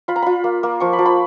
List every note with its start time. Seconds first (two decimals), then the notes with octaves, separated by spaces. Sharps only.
0.08 F4 B5
0.16 A#5
0.22 F4 B5
0.44 A#3
0.63 A#3
0.80 F3 C#6
0.93 B5
0.99 F3
1.05 B5